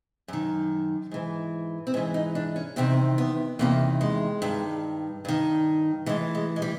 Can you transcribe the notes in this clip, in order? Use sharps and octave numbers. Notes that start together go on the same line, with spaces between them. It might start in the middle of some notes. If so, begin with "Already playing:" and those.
F#2 D#3
G#2 E3
C4
G#2 E3 C#4
D#4
D4
C#4
E2 C3 D#3 C4
B3
E2 C3 D#3 A#3
G#3
G2 D#3
G2 D#3
A2 E3 G#3
G#3
G#3
G3